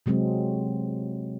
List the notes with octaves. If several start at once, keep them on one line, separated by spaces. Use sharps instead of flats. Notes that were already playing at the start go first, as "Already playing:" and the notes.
C3 F#3 G#3 C4